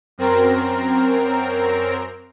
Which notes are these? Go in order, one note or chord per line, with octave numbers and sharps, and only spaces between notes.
F#2 C4 A#4